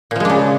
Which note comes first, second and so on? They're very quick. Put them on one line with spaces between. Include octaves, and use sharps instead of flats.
A#2 F3 G#3 D4 C#3